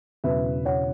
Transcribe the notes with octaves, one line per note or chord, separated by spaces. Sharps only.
E1 E2 C#3 F#3 B4 E5
C#5 F#5